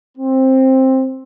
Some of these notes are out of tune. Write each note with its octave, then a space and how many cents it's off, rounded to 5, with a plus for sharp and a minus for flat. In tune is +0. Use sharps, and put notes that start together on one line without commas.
C4 +10